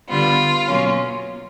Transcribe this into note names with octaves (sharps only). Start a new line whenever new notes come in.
D3 G3 B3 F4
B2 F#3 A#3 C#4